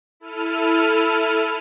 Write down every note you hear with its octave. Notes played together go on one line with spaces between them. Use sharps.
E4 A4 F6 D#7